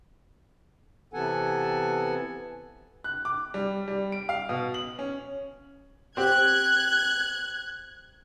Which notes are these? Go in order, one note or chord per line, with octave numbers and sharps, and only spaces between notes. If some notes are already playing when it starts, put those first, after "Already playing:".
C3 E3 B3 A4 F#5 G#5
F#6
D6
G3
G3
D7
F5
B2
F#7
C#4
C4 G4 F#6 G#6